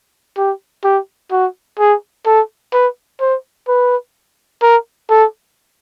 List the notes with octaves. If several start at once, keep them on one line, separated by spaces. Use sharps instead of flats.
G4
G4
F#4
G#4
A4
B4
C5
B4
A#4
A4